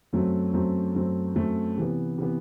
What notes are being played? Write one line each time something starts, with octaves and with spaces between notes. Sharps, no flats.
F#2 F#3 A3 C4
F#2 F#3 A3 C4
F#2 F#3 A3 C4
F#2 F#3 A3 C4
C3 E3 B3
C3 E3 B3